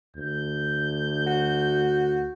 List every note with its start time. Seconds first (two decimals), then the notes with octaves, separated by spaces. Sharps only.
0.16 D2 G6
1.27 F#4